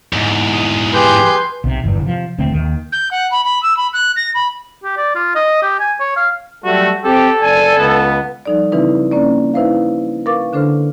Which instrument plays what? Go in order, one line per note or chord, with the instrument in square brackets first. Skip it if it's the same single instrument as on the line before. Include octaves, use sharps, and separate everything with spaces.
[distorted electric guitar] E2 G#2
[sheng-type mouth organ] D#6
[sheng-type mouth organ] G4 G#4 G6 [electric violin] B4 C6
[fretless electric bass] B1 C3
G1 E2 G2
C3 F3
E1 D2 A3 C4
D#2 D#3
[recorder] G6
F#5
B5
B5
E6
B5
F#6
A#6
B5
[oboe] G4
D5
F4
D#5
G4
G#5
C#5
F5
[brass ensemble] F#3 G3 A3 [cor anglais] F#4
[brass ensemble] C4 G4 [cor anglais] A4
[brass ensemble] F#1 D5 G#5
C#2 B3
[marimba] F3 G3 D#4 A4 D5
C#3 E3 C4 D#4 E4 B4
A#3 C#4 D5
D#4 E4 B4 C5 E5 F5
A#4 B4 F5 C#6 D6 A6
D3 D4 A4 C5 C6 F6